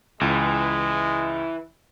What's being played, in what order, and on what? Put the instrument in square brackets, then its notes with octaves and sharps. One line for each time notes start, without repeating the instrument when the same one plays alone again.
[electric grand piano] C#2 [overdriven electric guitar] E3 [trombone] G#3